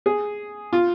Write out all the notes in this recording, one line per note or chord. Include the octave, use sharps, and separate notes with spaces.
G#4
F4